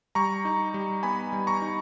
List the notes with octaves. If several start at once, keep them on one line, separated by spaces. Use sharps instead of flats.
G3 A#5 C#6
D#4
G3
B3 G#5 B5
G3
A#5 C#6
D#4